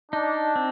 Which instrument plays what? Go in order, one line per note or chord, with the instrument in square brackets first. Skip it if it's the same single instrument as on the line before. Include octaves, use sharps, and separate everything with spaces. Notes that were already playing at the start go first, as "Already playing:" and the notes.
[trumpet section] D4 [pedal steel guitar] D#4
[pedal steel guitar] C4